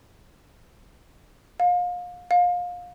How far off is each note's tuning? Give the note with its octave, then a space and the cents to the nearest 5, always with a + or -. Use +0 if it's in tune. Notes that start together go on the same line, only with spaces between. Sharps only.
F5 +30
F5 +25